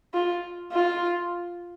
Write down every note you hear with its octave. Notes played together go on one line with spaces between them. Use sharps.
F4
F4